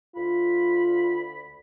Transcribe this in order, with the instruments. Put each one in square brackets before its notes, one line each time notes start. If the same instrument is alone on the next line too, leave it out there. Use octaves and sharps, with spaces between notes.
[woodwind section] D2 B5 [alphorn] F4